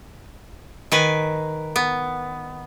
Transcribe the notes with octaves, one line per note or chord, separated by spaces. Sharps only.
D#3 B4 G#5
B3